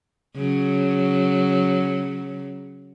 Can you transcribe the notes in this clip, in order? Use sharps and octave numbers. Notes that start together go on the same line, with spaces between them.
C#3 F#3